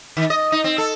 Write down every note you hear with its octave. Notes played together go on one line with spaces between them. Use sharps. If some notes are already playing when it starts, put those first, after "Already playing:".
D#3
D#5
D#4
C4
A4